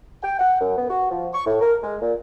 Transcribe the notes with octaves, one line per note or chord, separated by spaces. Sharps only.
G5
F#5
F#2
B3
F#4
F3
C#6
A2
A#4
G#3
A#2